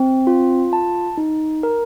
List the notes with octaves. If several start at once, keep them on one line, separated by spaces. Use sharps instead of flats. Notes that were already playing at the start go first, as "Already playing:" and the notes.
Already playing: C4
F4
A5
D#4
A#4